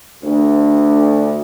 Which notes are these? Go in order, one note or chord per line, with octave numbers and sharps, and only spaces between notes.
D2